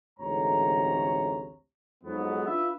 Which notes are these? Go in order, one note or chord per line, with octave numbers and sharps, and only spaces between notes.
A1 D2 G#2 C3 C#5 A#5
F2 G#2 F#3 B3
D4 F4 B4 E5